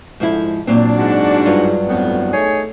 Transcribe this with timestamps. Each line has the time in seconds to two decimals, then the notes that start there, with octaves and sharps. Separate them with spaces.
0.20 G#2 D3 F3 E4
0.67 A#2 F#3 C4 D4
0.98 G#2 F#4
1.46 G2 F#3 F4
1.87 F2 A2 B3
2.33 A3 D#4 G#4 C#5